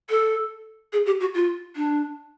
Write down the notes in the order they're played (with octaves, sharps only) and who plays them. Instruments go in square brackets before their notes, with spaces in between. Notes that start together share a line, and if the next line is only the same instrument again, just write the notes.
[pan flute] A4
G#4
G4
F#4
F4
D4